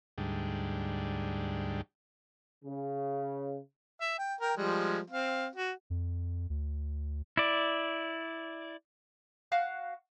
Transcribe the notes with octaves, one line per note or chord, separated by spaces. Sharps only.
D2 G#2 G3
C#3
E5
G5
A#4 G5
F3 G3 G#3
C4 F5
F#4
F2
D2
E4 D5
F#4 F5 F#6